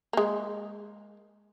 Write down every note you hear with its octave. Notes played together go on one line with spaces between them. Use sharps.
G#3 A#3